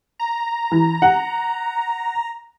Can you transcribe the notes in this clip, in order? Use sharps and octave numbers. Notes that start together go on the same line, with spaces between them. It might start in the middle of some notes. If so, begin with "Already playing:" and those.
A#5
E3
F#5